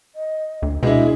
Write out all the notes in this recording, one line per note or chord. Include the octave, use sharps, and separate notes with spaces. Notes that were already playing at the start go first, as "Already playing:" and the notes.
D#5
D2
B2 G#3 D4 E4 G#4